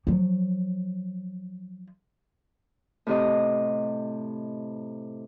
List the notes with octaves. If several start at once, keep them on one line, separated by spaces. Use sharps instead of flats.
F3 F#3
A2 C3 D#5